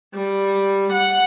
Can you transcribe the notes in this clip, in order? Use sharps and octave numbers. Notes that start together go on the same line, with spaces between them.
G3
F#5